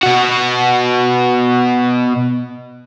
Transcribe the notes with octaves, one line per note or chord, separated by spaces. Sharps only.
B2 F#4